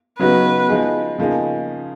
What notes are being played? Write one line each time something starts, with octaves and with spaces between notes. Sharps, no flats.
C#3 F#3 B3 D#4 F#4 B4
F3 G#3 D#4 G#4
C#3 F3 A#3 D#4 G#4